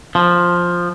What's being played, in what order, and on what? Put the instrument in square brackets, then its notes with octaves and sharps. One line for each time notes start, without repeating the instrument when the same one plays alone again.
[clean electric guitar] F3